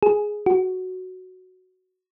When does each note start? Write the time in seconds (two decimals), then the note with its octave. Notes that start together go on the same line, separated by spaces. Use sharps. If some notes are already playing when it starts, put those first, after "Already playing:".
0.03 G#4
0.46 F#4